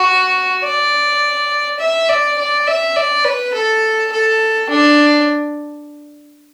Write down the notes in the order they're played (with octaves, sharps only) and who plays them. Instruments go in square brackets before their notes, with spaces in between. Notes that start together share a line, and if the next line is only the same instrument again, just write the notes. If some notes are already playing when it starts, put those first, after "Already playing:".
Already playing: [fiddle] F#4
D5
E5
D5
D5
E5
D5
B4
A4
A4
D4